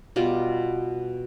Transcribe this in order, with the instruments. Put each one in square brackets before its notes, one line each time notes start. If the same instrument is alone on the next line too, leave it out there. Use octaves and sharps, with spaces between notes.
[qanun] B2 G3 F4